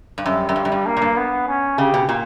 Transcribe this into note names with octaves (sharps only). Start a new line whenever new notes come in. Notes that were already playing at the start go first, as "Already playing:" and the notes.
G2
F#2 G3
F#2
G2
F#2
G2
A#3
A#2
G2
B3
C#4
C#3 G4
B2
A#2